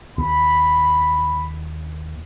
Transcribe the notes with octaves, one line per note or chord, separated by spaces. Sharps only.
D#2 B5